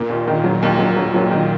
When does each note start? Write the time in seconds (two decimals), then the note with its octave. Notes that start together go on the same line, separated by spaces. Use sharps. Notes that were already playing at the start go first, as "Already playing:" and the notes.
Already playing: A#2 A#3
0.10 D#2
0.27 D#3
0.44 F#3
0.63 D#2
0.79 F#3
0.96 F#3
1.14 F#3
1.31 D#3